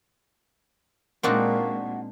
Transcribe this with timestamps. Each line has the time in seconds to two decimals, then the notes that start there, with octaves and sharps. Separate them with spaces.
1.23 A#2 G#3 A#3 C4 D4 D#4 F#4